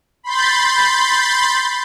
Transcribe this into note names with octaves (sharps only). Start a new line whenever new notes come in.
B5 C6 G6 A6